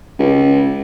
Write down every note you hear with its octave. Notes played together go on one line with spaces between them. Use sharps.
C#2